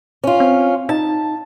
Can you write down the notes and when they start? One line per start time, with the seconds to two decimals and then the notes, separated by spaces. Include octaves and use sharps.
0.24 C#4 F4
0.40 C4
0.89 D#4 A5